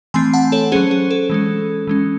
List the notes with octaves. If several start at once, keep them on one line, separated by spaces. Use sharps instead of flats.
E3 A3 C4 G#5 C6
F#5 A5
A4 C#5
F#3 C#4 G#4 C5
G#4
A4
E3 G#3 C#4
E3 G#3 C#4